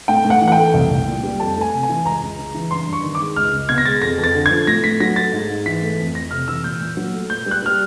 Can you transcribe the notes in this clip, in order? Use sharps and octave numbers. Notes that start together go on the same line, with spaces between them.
A2 G5
A2
F#5
E3
F#5
G5
A3
C2
C2
A#2
G3
F2 A5
A3 G#5
C3
G#5
E3
C#2 A#5
C#2
C#3
E3
G2 C6
G2
C#6
D#3
D6
G#3
C#2 F6
C#2
B2 G#6
A#6
G#3 A6
F2 A#6
F2
A6
D3
F3 G#6
A2 A#6
A2 B6
F#3 A#6
A3 A6
G#2
G#2
E3 B6
A3
F2
F2 A#6
C3 F6
E3 E6
A#2 G6
A#2
F#3
A3
A#2 G6
G3
F#6
G3 F6